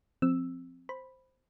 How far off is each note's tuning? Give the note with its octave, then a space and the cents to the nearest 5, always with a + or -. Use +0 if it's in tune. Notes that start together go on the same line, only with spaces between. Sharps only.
F3 +0 C4 +0 E6 +0
C5 +0 B5 +0